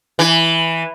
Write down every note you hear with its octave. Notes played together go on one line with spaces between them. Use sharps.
E3